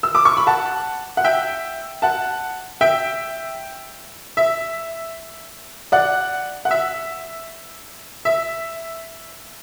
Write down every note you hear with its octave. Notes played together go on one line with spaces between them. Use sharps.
E6
D6
C#6
B5
F#5 A5
F#5
E5 G5
F#5 A5
E5 G5
E5
D5 F#5
F#5
E5
E5